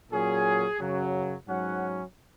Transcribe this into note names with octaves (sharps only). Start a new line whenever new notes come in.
A#2 F#3 C#4 G#4
F#2 C#3 F#3
G#2 F#3 C#4 F#5